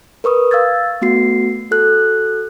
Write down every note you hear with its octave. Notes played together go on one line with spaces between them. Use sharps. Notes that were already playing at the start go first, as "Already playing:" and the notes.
A#4 B4 C#6 D#6
F5 E6 G#6 A6
A3 B3 F#4 C7
F#4 A4 F#6